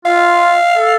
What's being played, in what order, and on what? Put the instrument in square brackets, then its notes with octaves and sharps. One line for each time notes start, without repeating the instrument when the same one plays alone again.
[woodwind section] F4 [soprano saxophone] F5
[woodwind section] A4